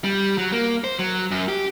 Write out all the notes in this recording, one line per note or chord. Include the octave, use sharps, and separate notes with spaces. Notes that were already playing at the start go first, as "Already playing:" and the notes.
G3
F#3
A#3
C5
F#3
F#2
G4